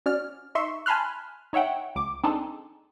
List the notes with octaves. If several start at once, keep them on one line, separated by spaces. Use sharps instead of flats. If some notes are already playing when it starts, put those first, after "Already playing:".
C#4 F#4 D5 F6
D#4 E5 C6 C#6
G#5 A5 B5 C6 F6 F#6
D#4 C#5 E5 F#5 G5
C#2 D6
C4 D4 D#4 G#4 A4